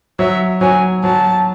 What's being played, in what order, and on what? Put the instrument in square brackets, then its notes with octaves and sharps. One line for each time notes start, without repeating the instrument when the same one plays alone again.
[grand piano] F#3 [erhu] E5
[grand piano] F#3 [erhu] G#5
[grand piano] F#3 [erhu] A5